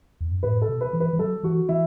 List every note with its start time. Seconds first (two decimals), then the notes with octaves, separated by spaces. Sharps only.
0.21 E2
0.31 F#2
0.43 A2 B4
0.62 A4
0.69 B2
0.81 B4
0.93 E3
1.00 B4
1.13 E3
1.18 F#3 A4
1.43 E3 F#4
1.69 E3 E4